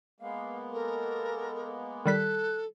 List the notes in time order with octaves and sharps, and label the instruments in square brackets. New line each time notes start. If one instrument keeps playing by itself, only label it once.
[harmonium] G#3 A#3 B3 [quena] F5
[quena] A4 [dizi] A#4
[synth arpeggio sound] D#3 G3 B6 [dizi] A4 [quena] F#6